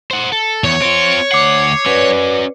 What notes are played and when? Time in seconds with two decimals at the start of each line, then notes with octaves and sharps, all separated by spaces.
0.11 C5 F#5
0.32 A4
0.64 E2 C#5
0.82 C4 F4 D7
1.32 D2 F#5 D6 C7
1.86 C#4 F#4 B4 D5